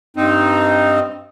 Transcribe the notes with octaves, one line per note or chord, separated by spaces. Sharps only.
G2 C4 D#4